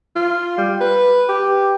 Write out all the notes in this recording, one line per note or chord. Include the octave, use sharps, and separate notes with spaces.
F4
G3
B4
G4